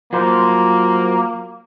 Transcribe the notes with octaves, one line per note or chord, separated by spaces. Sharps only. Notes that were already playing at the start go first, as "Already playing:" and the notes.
F#3 A#3 F4 C5